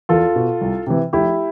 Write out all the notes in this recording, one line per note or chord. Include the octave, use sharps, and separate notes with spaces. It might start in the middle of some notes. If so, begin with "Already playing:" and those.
E2 F4 A4
B2
C2
C3 E3
F1 E4 G4